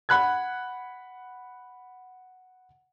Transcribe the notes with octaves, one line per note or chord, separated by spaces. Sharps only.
F#5 B5 F#6 G#6